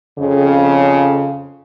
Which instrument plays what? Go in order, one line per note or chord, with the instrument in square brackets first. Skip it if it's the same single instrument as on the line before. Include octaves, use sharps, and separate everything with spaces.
[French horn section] F2 C#3